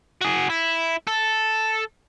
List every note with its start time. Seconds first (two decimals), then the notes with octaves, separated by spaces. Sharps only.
0.21 F#4 G#4
0.50 E4
1.07 A4